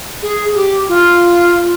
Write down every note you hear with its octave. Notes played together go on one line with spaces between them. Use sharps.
G#4
G4
F4